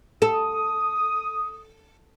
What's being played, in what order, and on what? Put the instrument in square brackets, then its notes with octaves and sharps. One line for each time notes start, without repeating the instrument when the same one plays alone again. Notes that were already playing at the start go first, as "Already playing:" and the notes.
[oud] A4 [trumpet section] D#6